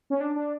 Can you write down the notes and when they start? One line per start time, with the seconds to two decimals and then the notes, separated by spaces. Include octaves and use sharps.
0.10 C#4
0.20 D4
0.36 D4